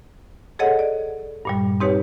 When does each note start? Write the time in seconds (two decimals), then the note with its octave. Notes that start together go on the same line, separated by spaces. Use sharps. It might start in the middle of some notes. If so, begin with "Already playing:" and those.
0.59 G#4 A4 C#5 D#5 F#5
0.79 D5
1.45 G2 A#2 G3
1.80 C4 D#4 G4 B4 C#5